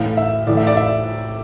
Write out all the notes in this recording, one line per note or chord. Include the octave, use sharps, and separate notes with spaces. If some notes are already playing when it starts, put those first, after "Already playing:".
Already playing: A2 E3 F5
E5
A2 E3 D5
E5
D5
E5